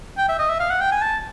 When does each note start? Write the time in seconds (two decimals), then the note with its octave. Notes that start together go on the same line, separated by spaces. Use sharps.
0.17 G5
0.29 E5
0.39 D#5
0.49 E5
0.60 F5
0.70 F#5
0.81 G5
0.92 G#5
1.02 A5